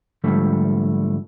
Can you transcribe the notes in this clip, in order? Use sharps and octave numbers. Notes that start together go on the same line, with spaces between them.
G#2 D3 F3 G3 A3